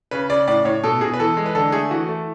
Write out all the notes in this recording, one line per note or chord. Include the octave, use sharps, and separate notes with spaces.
C#3 B4
C#3 D5
A2 D5
A2 C#5
B2 A4
B2 G#4
B4
E3 A4
G#3
B4
D3 A4
A3 G#4
E3 F#4
A3